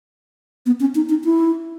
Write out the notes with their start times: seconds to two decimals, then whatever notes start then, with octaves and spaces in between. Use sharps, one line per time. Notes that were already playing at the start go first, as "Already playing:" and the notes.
0.66 B3
0.80 C#4
0.95 D#4
1.09 D#4
1.24 E4